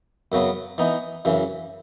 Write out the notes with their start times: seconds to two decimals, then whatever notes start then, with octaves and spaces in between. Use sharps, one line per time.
0.32 F#2 C#3 F#3 B3
0.78 E3 B3 D#4
1.25 F#2 C#3 E3